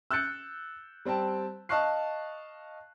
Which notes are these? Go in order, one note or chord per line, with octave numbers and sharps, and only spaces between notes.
E6 F#6 G6 A6 C#7
G3 C4 G5 A5
D#5 F5 A5 C#6 F#6 C7